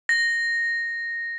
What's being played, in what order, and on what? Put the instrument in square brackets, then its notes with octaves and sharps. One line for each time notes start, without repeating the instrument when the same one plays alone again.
[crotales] A#6